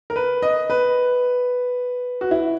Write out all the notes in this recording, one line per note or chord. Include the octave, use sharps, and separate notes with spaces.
A#4
B4
D#5
B4
F#4
E4